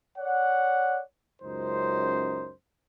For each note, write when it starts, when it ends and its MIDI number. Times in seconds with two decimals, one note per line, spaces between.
0.18 0.99 73
0.18 0.99 74
0.18 0.99 78
1.42 2.53 37
1.42 2.53 42
1.42 2.53 63
1.42 2.53 72